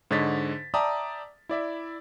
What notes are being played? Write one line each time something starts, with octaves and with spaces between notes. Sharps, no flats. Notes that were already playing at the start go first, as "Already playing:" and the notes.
G#2 D3 C#5 D#5 A6 B6
D5 E5 G5 A5 A#5 D#6
E4 D5 E5